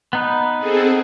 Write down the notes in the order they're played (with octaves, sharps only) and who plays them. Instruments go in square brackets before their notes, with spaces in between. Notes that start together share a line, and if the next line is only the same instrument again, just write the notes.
[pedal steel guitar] B3 D#4 B4
[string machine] C4 G#4 A4